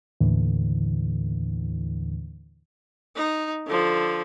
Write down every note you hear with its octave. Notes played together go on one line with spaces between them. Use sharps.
D#2 A2 D3 E3
D#4
D3 F3